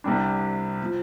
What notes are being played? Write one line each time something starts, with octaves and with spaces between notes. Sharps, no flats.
C2 C3 G3 D4
F3